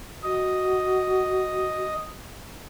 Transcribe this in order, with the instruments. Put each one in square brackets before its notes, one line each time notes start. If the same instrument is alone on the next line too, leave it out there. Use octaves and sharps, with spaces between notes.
[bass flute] F#4 [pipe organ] D#5